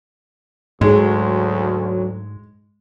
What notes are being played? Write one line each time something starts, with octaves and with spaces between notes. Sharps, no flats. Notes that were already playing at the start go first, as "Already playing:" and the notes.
D2 G#2 F#3 G#3